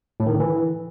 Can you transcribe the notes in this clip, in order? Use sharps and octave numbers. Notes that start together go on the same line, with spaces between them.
A2
D#3
D3
E3